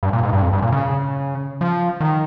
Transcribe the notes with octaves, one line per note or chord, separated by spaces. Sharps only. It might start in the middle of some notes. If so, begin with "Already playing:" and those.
G2
A#2
G#2
G2
F2
G2
A#2
C#3
F3
D#3